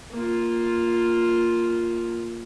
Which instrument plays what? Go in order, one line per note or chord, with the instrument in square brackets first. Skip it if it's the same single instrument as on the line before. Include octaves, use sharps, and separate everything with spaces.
[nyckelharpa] A#3 F4